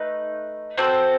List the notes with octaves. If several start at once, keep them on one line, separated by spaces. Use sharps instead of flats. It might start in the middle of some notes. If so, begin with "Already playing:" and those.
Already playing: A3 D#4 B4
C4 F#4 A4 C5